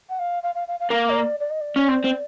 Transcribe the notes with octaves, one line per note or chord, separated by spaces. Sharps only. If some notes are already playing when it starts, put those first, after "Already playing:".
F#5
F5
F5
F5
F5
F5
A#3 F5
C#5
D5
D5
D#5
D5
C#4
C4
C4